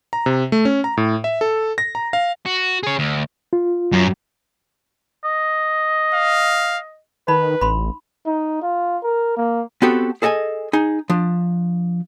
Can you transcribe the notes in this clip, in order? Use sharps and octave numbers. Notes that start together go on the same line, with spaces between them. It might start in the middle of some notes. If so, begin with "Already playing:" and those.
A#5
C3
A3
C#4
A#5
A2
E5
A4
A#6
A#5
F5
F#4
G#4 C#5
D2
F4
F#2
D#5
F5
D#3 D#4 B4 B5
A1 B5 C6
D#4
F4
A#4
A#3
B3 C4 F#4 G4 A4
G#4 A4 D#5 F#5 G#5
D#4 G#4
F3 D4